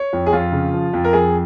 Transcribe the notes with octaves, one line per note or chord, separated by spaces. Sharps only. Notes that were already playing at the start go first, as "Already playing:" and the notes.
Already playing: C#5
F2
G#4
F2 F4
C#3
F3
F2
A#4
F2 G#4